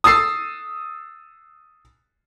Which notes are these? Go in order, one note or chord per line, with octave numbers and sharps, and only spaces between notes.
D#6 E6 A6 C7